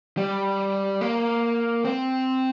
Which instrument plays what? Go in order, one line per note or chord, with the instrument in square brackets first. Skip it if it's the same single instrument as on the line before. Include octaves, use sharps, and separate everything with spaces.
[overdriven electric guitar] G3
A#3
C4